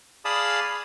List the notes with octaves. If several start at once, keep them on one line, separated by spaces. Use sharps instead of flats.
G#4 D5 F5 A5 B5 D#6